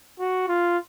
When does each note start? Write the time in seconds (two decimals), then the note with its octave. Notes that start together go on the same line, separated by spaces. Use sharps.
0.20 F#4
0.48 F4